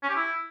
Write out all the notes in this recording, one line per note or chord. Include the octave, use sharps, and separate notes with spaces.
C#4
G4
E4